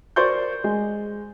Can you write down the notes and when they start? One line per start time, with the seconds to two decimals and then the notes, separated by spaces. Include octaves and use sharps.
0.16 A#4 C5 D5 C6 C#6 G6
0.64 G#3